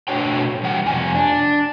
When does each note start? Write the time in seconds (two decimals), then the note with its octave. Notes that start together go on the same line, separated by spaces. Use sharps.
0.08 B2 A3 D4 F#4 C#5 G5
0.63 E3 G3 F#5 G5
0.86 F2 C3 G#5
1.15 D4